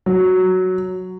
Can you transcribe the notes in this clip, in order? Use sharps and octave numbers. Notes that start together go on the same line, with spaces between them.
F#3